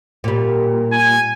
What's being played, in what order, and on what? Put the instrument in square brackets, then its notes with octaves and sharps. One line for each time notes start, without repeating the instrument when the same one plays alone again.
[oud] A#2 G3
[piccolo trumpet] G#5